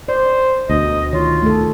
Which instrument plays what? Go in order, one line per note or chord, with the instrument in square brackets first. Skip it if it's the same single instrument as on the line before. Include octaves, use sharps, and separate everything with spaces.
[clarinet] C5 [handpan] D5
[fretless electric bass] D2 B2 [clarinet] D#5
[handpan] D#3 C#5 [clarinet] F4
[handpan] A3 A4